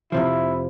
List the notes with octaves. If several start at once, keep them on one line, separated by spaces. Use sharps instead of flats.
F2 C3 F3 E4